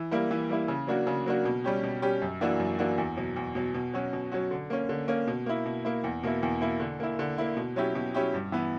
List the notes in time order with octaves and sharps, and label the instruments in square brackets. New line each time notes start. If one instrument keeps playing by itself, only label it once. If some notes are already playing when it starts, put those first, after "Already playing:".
Already playing: [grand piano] E3
G3 A#3 E4
E3
G3 A#3 E4
C#3
F#3 A#3 D4 F#4
C#3
F#3 A#3 D4 F#4
B2
G3 C#4 G4
B2
G3 C#4 G4
F#2
E3 A#3 D4 F#4
F#2
E3 A#3 D4 F#4
E2
B2 F#3
E2
B2 F#3
B2
F#3 C#4 F#4
B2
F#3 C#4 F#4
D3
A#3 C#4
D3
A#3 C#4
B2
A#3 E4
B2
A#3 E4
E2
B2 A#3 E4
E2
B2 A#3 E4
D3
A#3 E4
D3
A#3 E4
B2
F#3 C#4 E4 G4
B2
F#3 C#4 E4 G4
G2
E3 B3